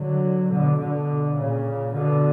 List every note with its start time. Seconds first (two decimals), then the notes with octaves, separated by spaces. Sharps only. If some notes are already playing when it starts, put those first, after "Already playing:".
Already playing: D3 F#3
0.51 B2 D3
0.79 B2 D3
1.37 A#2 C#3
1.94 B2 D3